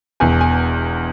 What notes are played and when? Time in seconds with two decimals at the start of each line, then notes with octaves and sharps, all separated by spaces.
0.20 E1 E2 E3 G#5
0.41 G#5